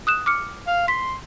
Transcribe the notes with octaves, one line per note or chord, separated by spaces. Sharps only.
D#6 F#6 E7
D6 F6 C#7
F5
C6 B6